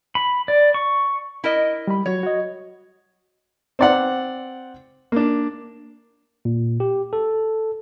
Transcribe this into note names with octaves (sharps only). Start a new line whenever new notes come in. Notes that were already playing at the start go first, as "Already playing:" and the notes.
B5
D5
C#6
E4 A#4 D#5
G3 B5
F#3 F#4 C#5
F#4 D#5
C4 D5 F#5
A#3 D4
A#2
G4
A4